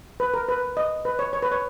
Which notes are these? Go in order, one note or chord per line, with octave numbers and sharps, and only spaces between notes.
B4
A#4
B4
D#5
B4
C#5
C#5
B4
C#5